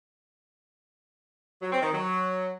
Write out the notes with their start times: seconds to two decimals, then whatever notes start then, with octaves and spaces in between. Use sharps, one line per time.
1.62 F#3
1.72 C4
1.82 D#3
1.92 F#3